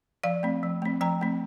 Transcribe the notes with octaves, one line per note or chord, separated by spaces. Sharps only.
F3 D5 F5
A3 C4
F3
A3 C4
F3 G5 A#5
A3 C4